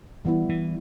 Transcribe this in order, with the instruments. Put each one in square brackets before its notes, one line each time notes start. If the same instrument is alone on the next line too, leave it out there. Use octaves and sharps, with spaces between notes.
[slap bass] E3 [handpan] G3 B3 E4
[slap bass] E3